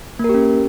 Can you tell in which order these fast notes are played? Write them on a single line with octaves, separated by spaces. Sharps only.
A#3 A#4 G4 C#4